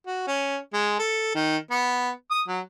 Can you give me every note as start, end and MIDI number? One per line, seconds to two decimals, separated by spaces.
0.06 0.24 66
0.27 0.58 61
0.73 0.97 56
0.99 1.31 69
1.35 1.57 51
1.71 2.10 59
2.31 2.41 87
2.48 2.60 54